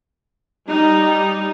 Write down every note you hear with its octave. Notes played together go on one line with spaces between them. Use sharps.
G3 D#4